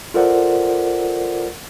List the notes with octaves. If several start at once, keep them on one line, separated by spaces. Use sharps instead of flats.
F4 A4 A#4 C5 D5 F#5